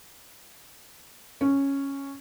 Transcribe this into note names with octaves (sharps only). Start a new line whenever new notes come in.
C#4